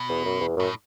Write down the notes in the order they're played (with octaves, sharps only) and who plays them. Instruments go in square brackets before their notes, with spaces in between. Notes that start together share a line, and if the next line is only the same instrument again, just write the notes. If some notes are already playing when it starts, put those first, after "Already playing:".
Already playing: [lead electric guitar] B2
[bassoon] E2
F#2
E2
[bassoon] F#2 [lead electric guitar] A2